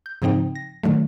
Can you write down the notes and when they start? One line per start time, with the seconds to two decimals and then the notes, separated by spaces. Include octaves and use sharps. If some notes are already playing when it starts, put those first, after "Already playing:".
0.06 G6
0.22 G#2 C#3 F3 C4 D#4 G5
0.55 A#6
0.83 D3 D#3 F#3 A3